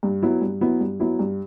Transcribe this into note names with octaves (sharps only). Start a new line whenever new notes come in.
G2
F#3 B3 E4
G2
F#3 B3 E4
G2
F#3 B3 E4
G2